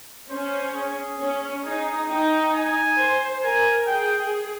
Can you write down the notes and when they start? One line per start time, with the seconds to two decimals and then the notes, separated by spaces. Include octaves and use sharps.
0.30 C#4 C5
0.74 G#4
1.20 C#4
1.64 D#4 G#4
2.09 D#4 G5
2.54 G#5
2.98 C5
3.43 A#4 G#5
3.87 G#4 G5